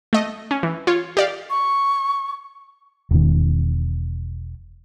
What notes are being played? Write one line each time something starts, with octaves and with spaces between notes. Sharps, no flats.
A3 D#5
C#4
E3
F4 C#5
G4 D5 F5
C#6
E1 B2 D#3